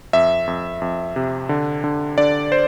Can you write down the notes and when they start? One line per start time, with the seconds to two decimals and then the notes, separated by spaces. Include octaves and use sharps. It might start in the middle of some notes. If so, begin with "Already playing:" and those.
0.13 F2 E5
0.47 F2
0.82 F2
1.16 C3
1.49 D3
1.84 D3
2.18 D3 D5
2.52 C5